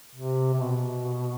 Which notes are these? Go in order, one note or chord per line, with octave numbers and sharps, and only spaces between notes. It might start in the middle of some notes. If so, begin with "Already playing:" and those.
C3
C3
B2